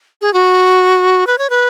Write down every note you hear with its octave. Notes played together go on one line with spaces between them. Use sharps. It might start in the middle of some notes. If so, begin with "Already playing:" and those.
G#4
F#4
B4
C#5
B4